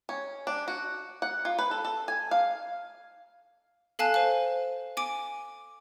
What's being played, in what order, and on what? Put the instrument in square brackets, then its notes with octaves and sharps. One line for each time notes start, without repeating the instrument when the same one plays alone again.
[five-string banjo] C#4
D4
F#4
F#5
F4
B4
A4
A4
G#5
F5
[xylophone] A4 F5 G#5 A5 F#6
C5 F5
G#5 D6 D7